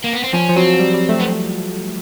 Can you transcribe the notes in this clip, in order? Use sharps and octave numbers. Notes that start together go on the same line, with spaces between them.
A#3
B3
C4
F3 C#4
F3
F#3 C4
G3
G3
A3
B3